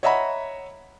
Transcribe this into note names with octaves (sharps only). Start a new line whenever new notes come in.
C#5 D#5 E5 F#5 A#5 B5